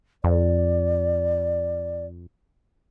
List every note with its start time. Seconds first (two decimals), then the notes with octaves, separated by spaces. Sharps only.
0.24 F2 D5